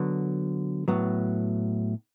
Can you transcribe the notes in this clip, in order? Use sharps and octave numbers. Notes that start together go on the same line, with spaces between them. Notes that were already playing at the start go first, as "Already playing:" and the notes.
Already playing: D3 F#3 B3
A2 F#3 B3